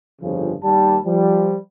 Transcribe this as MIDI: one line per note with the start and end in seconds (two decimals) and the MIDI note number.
0.21 0.54 31
0.21 0.54 41
0.21 0.54 49
0.21 0.54 53
0.63 0.98 39
0.63 0.98 55
0.63 0.98 81
1.05 1.56 53
1.05 1.56 55